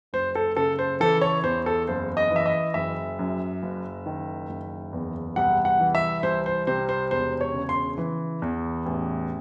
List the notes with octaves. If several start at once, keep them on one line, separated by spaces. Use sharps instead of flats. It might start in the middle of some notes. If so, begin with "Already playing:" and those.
F#1 C5
A4
C#3 A4
C5
E3 A4
C#5
E2 C5
A4
F#1 C5
D#5
E3
E5
D#5
F#1 E5
F#2
F#1
D#3
F#1
E2
C2 F#5
F#5
E3
E5
C2 C5
C5
C3 C5
C5
E1 C5
C#5
C#3
C6
E3
E2
A1